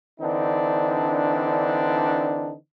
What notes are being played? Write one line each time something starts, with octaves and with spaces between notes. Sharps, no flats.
D3 E3 C4 D4 D#4